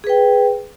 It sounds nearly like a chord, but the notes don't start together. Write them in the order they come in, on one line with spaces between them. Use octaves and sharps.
G#4 B4 G5